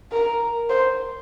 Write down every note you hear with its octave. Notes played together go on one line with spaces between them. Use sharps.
A#4
C5